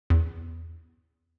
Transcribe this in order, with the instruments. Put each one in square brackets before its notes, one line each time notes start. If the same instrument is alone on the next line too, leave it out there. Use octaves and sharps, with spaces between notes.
[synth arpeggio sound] E2